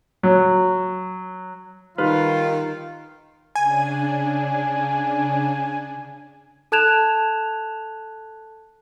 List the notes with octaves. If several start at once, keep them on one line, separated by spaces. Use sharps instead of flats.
F#3
D#3 G3 D#4 F4 B4 F6
C#3 D4 G#5
A4 A5 F#6 G#6 E7 F7